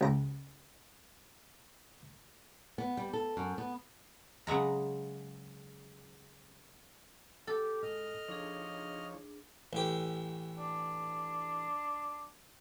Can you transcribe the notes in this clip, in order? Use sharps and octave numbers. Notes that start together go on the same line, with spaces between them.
C#2 A#5
B3
G3
A4
F#2
B3
C#3 F#3 G#3 A#5
G4 A4
G#2 D#5 F6
F3 D4 D#4 G#4 C#5
A1 G4
D4